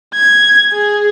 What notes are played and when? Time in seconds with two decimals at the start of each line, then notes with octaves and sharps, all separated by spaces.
0.15 G#6
0.73 G#4